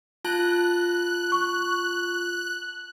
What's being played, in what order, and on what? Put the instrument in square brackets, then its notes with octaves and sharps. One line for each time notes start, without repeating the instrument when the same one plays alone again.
[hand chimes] F4 A5 [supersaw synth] F#6
[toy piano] C#6